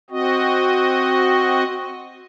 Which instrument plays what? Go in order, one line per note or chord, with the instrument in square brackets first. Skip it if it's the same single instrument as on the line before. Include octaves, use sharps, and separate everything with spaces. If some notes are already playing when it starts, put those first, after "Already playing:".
[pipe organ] C4 F#4 D#5